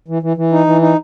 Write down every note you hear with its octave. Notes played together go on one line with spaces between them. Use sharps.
E3
E3
E3
D#4
E3
D#4